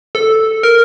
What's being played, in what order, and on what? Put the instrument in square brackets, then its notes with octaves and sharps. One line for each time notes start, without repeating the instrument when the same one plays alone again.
[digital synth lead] A4
A#4